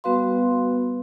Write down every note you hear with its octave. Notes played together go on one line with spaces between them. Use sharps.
G3 B3 F#4 B4 F5 C6